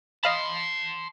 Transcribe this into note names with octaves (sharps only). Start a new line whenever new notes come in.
D#5 F5 A5 B5 C6